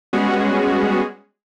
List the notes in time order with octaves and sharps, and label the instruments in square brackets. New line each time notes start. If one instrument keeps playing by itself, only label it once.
[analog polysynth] G3 G#3 B3 C#4 F#4 G#4